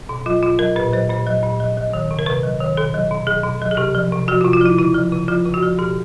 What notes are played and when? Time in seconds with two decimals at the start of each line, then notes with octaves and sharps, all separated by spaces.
0.09 B2
0.26 F#3 F4
0.43 B2 F4
0.59 F#3 A#4
0.76 A#2 B4
0.93 F#3 C5
1.09 A#2 C5
1.26 F#3
1.43 A#2
1.60 F#3
1.77 F#3
1.93 D#3
2.11 C3
2.19 A#4
2.26 C3 B4
2.43 F#3
2.61 D#3
2.77 B2 A4
2.94 F#3
3.11 B2
3.27 F#3 G#4
3.44 B2
3.61 F#3
3.71 G#4
3.77 C3 G4
3.95 F3
4.12 C3
4.28 F3 F#4
4.41 F4
4.45 C3
4.53 F4
4.61 F3 E4
4.78 C#3 E4
4.94 F3
5.12 C#3
5.28 F3 F4
5.46 C#3
5.54 F#4
5.63 F3
5.79 B2 G4